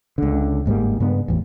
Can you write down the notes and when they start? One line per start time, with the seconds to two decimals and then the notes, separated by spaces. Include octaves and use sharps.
0.18 C#2 D3
0.66 G1 G#2 G3 A#3
1.00 G2 C#3 B3
1.28 A1 E2